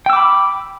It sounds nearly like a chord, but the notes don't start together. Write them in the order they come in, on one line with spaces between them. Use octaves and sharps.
G5 E6 D6 B5